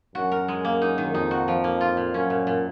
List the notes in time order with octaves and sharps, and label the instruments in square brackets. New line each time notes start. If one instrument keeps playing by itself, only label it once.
[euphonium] F#2 [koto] F#4
[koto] A#4
G#3
A#3
D#4
D#3
[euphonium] F2 [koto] D#4
[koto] F#4
F3
A#3
F4
A#2
[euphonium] F#2 [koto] C#4
[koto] A#2
A#2